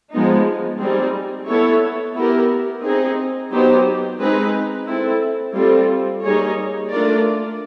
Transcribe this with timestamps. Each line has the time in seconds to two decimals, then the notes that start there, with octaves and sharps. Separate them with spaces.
0.12 F3 G#3 B3 D#4
0.80 G3 C4 D#4 G#4
1.48 B3 E4 A4 C#5
2.16 B3 E4 G4 A#4
2.83 C4 D#4 G#4
3.52 F#3 B3 D#4 G4 C5
4.19 G#3 C4 D#4 G#4 B4
4.87 C4 E4 A4
5.55 G3 C4 F4 A4
6.24 G3 A#3 D#4 G#4 C#5
6.91 A3 D4 F4 A#4 D5